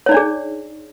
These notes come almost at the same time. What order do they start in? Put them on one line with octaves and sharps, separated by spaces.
C#5 D#4 D5 D4 G#4